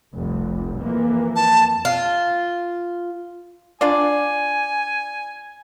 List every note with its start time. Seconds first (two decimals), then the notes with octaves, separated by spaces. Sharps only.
0.13 F1 C2
0.79 F2 E3 A#3
1.36 A5
1.85 F4
3.81 D4 F4 D5 G#5